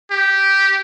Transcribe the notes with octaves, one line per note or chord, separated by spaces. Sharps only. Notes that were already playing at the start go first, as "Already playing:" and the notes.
G4